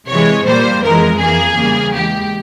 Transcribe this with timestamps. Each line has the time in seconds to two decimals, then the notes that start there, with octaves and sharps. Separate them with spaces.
0.08 C3 E3 G#3 C#5
0.46 A#2 G3 A#3 C5
0.83 F2 E3 G#3 A#4
1.20 F2 E3 A#3 G#4
1.57 E2 C#3 E3 G3 A#3
1.94 E2 E3 G#3 G4